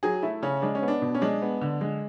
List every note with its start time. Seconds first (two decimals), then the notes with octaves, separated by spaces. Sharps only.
0.03 F#3 G#4
0.23 A3 E4
0.42 C#3 C#4
0.62 G#3 D4
0.75 C#4
0.82 B3
0.88 D4
1.02 B2
1.15 C#4
1.21 G#3 D4
1.42 B3
1.61 D3
1.81 G#3